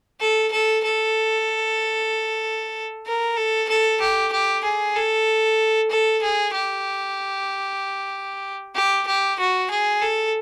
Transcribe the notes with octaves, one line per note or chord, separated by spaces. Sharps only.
A4
A4
A4
A#4
A4
A4
G4
G4
G#4
A4
A4
G#4
G4
G4
G4
F#4
G#4
A4